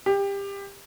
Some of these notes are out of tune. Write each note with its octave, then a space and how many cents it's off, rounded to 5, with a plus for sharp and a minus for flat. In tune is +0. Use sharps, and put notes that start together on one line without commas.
G4 +20